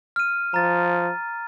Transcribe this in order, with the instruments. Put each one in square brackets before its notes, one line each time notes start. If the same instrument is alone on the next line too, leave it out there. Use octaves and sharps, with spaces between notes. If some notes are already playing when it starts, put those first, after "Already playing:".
[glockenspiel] F6 D#7
[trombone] F3 [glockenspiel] A#5 A6